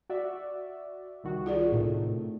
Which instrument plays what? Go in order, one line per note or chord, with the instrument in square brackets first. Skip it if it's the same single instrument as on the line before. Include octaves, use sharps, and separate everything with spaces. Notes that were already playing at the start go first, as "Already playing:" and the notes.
[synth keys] F#4 D5 E5
C2 D#3 F#4
[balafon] F4 G#4 D5
[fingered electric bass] A2 C3 [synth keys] D#3 A3